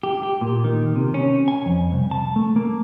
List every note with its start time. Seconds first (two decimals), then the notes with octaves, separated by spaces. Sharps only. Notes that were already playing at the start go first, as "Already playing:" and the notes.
0.03 G4
0.23 G4
0.41 A#2
0.64 D#3
0.96 C3
1.14 C#4
1.48 G#5
1.66 F2
1.93 C2
2.11 A5
2.36 A3
2.56 A#3